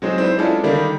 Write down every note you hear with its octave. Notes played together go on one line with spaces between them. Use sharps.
F#3 G#3 C4 D#4
C4 D4 E4 B4 C5
G#3 C#4 D4 E4 F4 A4
D3 D#3 G3 A#3 D4